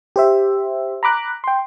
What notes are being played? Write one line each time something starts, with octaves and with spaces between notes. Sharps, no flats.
G4 C5 E5
A#5 B5 D6 F#6
G5 C6